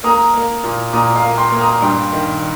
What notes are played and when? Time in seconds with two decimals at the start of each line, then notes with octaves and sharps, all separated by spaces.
0.04 A#3 A#5 D#6
0.34 A#3
0.64 A#2
0.93 A#2 A#5 D#6
1.15 F5 A#5
1.23 A#3
1.38 G5 C6
1.52 A#3
1.60 A#5 D#6
1.82 G2 G5 C6
2.12 D#3